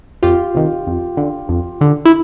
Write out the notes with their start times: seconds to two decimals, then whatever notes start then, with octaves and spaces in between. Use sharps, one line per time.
0.22 F2 F4 G4
0.54 C3 D#3
0.87 F2
1.17 D3
1.49 F2
1.81 D3
2.05 E4